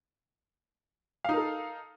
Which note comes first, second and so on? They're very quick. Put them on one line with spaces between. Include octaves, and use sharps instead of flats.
F5 D#4 A#4 A4